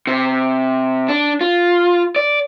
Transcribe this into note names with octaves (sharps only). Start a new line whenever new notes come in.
C3
D4
F4
D5